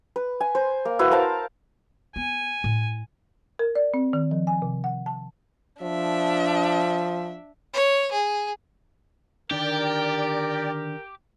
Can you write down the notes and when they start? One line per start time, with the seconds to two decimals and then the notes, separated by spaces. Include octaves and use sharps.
0.16 B4
0.41 G#5
0.55 C5
0.85 A#3
0.99 E4 F#4 B4 F5
1.11 A#4 C5 F5 A5
2.16 B3 G#5
2.64 A2
3.59 A#4
3.76 D5
3.94 C4
4.13 D#3
4.31 F3
4.47 G#5
4.62 C3
4.84 F#5
5.06 A5
5.82 F3 D4 E5
7.73 C#5
8.12 G#4
9.51 D3 D#3 D4 G4 A#4 D5 G5